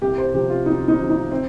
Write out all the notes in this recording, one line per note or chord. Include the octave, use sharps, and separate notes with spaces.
C2 G4
C5
C3 F3 G4
F4
C2 D#4
D#4
C3 F3
D#4
C4